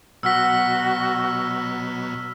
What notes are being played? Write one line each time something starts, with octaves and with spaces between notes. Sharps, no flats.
B2 F#3 F#4 E6 F6 B6